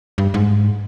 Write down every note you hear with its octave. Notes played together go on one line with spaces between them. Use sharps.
G2
G#2